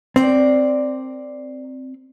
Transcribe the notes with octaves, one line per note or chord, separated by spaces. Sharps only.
C4 A#4 D5